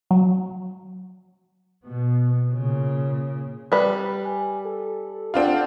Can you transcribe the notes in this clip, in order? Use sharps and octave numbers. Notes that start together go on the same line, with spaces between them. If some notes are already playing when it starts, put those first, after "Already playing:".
F#3
B2 B3
A#2 C#3
G3 B4
G#5
A4
C4 D4 F4 F#5